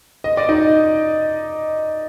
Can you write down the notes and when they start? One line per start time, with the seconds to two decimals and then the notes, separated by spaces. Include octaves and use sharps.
0.24 D#5
0.37 D5
0.49 D#4 D#5